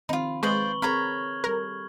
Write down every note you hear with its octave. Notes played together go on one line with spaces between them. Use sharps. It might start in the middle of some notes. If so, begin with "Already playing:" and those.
D#3 F3 C4 D#4 F4 B5
G#3 F4 B4 C5 D5 C#6 F#7 G7
C4 G#4 A#4 C#5 A#5 B5 F6 G#6
G3 A4 A#4